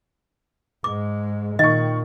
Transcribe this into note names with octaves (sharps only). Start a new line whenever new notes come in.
G#2 G#3 D6
A#2 D#3 D#5 C#6